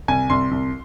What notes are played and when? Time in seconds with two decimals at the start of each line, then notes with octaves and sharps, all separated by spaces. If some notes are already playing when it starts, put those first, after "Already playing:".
0.08 C2 G#5
0.30 C2 C6
0.51 C2